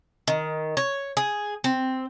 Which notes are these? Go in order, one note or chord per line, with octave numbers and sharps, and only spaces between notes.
D#3
C#5
G#4
C4